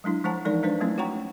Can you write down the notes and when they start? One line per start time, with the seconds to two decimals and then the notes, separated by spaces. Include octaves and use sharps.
0.04 F#3 G#3 D4 E4
0.24 F3 G#3 C5 F#5 A5 A#5
0.45 E3 G#3 D#4 A#4 D5
0.63 G#3 D4 B4 C5
0.80 F#3 A3 C4 C#4 E4
0.98 F#4 C#5 F#5 G5 A#5 C#6